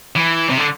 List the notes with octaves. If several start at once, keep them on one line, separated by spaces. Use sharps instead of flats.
E3
C3
D3